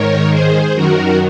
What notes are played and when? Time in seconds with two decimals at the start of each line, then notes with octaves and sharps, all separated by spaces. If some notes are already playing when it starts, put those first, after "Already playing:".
Already playing: G#2 D#3 A#4 C#5
0.30 G#4 C5
0.75 F#2 D#3 F#4 A#4